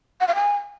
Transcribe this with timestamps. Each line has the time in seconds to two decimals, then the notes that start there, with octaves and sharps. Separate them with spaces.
0.20 F#5
0.28 F5
0.35 G#5